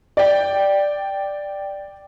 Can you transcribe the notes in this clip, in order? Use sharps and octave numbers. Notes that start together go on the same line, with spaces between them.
D5 G5